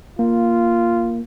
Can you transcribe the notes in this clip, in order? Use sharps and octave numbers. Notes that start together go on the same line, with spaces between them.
A#3 F4